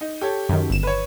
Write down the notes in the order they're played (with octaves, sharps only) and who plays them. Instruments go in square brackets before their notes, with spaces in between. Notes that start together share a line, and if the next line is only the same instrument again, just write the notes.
[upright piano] D#4
G4 A4 C#5
[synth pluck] F#2 D#3
G1 E7
[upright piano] B4 C#5